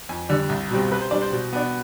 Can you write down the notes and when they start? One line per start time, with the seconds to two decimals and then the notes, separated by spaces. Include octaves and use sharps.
0.09 F2 G#5
0.29 D3 G3 D4
0.49 C2
0.71 B2 G3 C4
0.91 C3 B4
1.01 C5
1.11 G3 D4 D5
1.22 C5
1.32 B2
1.53 B3 D4